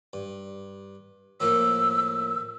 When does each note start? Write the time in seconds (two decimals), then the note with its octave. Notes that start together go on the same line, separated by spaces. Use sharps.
0.13 G2
1.40 A2 F3 A#3 E6